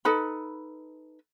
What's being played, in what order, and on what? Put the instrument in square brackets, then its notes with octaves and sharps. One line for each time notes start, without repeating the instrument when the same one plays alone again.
[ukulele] D#4 A4 B4 B5